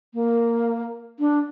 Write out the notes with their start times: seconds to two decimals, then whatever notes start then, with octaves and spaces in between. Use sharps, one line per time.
0.14 A#3
1.19 D4